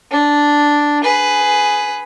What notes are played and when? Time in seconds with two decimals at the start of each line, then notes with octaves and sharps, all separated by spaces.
0.11 D4
1.04 G#4 B4